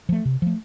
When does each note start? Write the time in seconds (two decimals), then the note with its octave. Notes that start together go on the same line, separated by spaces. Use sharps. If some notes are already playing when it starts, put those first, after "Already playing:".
0.09 F3 A3
0.25 C3
0.42 F3 A3